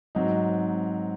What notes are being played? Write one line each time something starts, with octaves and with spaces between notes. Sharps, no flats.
G#2 F#3 C4 D#4